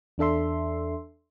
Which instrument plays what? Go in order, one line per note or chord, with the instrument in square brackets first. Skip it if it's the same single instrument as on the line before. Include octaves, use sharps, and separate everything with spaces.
[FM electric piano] E2 D4 A4 E5 C6